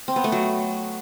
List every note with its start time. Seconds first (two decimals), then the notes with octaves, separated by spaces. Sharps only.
0.08 C4
0.16 B3
0.24 A3
0.32 F#3